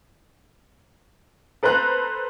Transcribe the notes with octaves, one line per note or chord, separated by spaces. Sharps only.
A4 B4 C5 A#5 F#6